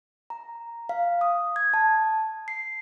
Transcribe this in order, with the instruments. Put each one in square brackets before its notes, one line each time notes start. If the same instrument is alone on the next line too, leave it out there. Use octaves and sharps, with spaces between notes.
[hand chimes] A#5
F5
D#6
G#6
A5
C7